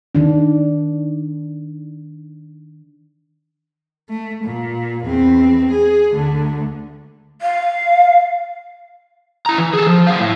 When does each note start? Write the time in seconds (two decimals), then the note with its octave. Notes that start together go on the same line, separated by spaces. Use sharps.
0.15 D#3 D4
4.09 A3
4.44 A#2
5.05 E2 C4
5.71 G#4
6.12 D2 D3
7.42 F5
9.46 E4 A#5
9.58 E3
9.73 G#4 A4
9.87 F3
10.07 F#3 F5
10.20 A2